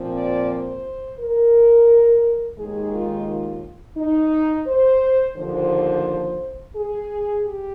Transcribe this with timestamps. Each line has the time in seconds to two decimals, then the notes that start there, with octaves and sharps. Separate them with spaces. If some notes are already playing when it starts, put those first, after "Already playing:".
Already playing: A#2 F3 C4
0.14 D5
0.49 C5
1.19 A#4
2.58 D#2 D#3 G#3 G#4
2.93 F4
3.27 F4
3.97 D#4
4.66 C5
5.36 D#2 D3 F3 C5
6.75 G#4
7.44 G4